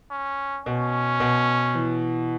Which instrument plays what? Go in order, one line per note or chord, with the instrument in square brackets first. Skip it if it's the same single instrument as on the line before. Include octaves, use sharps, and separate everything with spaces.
[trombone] C#4
[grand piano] B2 [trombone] C#4
[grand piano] B2
E3